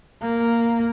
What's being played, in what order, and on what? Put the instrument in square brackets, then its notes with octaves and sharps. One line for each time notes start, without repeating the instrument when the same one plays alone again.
[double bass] A#3